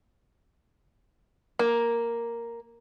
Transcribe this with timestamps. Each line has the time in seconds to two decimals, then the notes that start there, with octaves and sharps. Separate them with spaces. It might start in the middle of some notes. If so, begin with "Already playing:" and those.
1.59 A#3